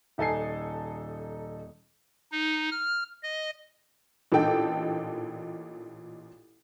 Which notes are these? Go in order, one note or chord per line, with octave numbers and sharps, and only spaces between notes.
D#1 D#4 A4 G#5 C7
D#4
F6
D#5
A1 A#2 D4 D#4 A4 G5